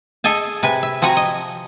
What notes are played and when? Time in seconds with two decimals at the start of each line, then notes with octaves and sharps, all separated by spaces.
0.24 G#4 A4 D#5 G#5 A5
0.63 C3 B4 G#5
0.83 E5
1.02 F3 C4 F#4 F#5 G#5 A#5
1.17 D#5